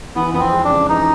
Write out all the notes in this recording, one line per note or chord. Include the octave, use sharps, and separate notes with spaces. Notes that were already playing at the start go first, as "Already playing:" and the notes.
E3 B3
F2 B3
C4
G#3
D4
C#3
E3 D#4